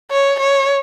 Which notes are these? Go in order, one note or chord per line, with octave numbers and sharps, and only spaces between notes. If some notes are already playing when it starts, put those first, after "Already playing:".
C#5
C#5